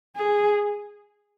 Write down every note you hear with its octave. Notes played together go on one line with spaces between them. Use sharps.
G#4